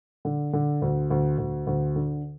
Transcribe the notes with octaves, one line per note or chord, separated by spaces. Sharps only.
D3
D3
D2
D2
D2
D2
D3